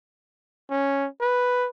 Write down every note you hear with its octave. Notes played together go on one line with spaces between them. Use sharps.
C#4
B4